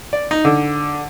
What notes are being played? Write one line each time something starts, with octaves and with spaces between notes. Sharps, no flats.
D5
D#4
D3